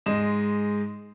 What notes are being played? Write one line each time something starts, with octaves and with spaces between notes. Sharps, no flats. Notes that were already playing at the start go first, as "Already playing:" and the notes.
G#2 G#3 D#5 E7